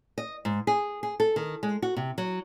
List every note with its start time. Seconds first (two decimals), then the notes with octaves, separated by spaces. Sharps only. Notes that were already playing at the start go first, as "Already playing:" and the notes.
0.18 D#5
0.45 G#2
0.67 G#4
1.03 G#4
1.20 A4
1.36 D#3
1.63 G#3
1.82 F#4
1.96 C3
2.18 F#3